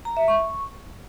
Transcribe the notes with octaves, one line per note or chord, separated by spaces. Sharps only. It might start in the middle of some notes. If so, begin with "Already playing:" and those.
A#5
E5
C#6